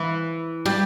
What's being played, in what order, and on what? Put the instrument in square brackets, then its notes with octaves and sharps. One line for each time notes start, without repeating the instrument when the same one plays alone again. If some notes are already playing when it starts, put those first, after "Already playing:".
Already playing: [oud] E3 E4
G3 G4